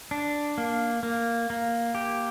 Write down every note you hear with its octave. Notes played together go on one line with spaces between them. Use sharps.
D4
A#3
A#3
A#3
G4